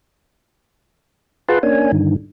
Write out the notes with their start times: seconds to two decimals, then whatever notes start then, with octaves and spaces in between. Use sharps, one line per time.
1.48 F4 G#4 B4 F#5 A5 C6
1.63 A#3 C#4 D4 G#5
1.92 G2 D3 D#3